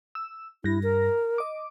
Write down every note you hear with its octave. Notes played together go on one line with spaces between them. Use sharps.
E6
G2 E4 A#6
A#4
D#5 D6